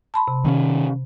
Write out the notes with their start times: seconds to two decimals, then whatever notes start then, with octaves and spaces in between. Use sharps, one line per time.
0.14 A5 B5 C6
0.28 C3
0.45 D#3 C4 C#4